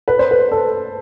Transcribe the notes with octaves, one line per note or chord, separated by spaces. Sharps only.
B4
C5
B4
A4